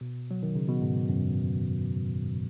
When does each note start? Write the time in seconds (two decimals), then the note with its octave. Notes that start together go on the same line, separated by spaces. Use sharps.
0.01 B2
0.31 F#3
0.43 D#3
0.56 C#3
0.68 B2
0.82 G#2
1.08 F#2